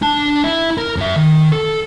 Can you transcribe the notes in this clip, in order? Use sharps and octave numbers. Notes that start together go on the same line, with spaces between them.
D4 A5
E4
A#4
F#2 E5
D#3
A4